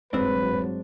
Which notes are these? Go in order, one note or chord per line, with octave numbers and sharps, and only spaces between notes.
D#1 G#1 G2 F#3 G#3 C4 D4 B4